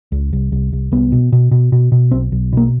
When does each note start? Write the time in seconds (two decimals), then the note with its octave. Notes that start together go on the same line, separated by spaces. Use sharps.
0.12 C#2
0.33 C2
0.52 C2
0.73 C2
0.92 C2 B3
1.12 B2
1.32 B2
1.51 B2
1.72 B2
1.92 B2
2.11 B1 C4
2.32 B1
2.53 B2 A#3